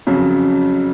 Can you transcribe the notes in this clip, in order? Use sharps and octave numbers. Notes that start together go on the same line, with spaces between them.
F2 C#3 F#3